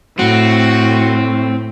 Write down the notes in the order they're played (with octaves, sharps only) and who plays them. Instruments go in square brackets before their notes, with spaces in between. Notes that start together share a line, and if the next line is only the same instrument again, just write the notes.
[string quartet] A2 [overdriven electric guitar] C4 [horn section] F#4